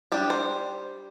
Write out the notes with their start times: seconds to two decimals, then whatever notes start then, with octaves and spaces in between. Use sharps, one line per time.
0.12 G3 D4 G4
0.30 C5